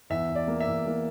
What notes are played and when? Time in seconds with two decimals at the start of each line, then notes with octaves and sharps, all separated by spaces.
0.10 E2 E5
0.30 E2
0.35 D5
0.48 A#3
0.60 E5
0.67 E2
0.86 A#3